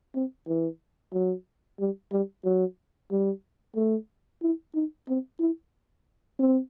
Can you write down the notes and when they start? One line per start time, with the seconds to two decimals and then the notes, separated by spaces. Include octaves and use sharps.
0.15 C4
0.48 E3
1.13 F#3
1.80 G3
2.12 G3
2.45 F#3
3.11 G3
3.76 A3
4.42 E4
4.75 D#4
5.08 C4
5.40 E4
6.39 C4